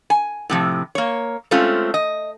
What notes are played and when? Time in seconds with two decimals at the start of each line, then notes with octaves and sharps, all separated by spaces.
0.10 G#5
0.50 A2 C3 F3
0.95 A#3 C#5
1.51 G#3 A3 C4 C#4 F4
1.94 D#5